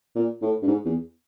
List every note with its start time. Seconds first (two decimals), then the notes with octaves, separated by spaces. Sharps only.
0.15 A#2
0.42 A2
0.62 G2
0.67 G#2
0.85 E2